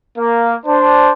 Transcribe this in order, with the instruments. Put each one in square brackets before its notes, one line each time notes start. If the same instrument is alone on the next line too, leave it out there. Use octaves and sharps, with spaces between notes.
[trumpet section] A#3
D4 C5